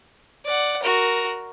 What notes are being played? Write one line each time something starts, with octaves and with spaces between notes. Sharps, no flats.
D5 F#5
F#4 A#4